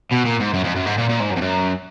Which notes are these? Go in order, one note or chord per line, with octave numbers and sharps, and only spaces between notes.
B2
A#2
G#2
F#2
F2
F#2
G#2
A#2
A#2
G#2
F#2
F2
F#2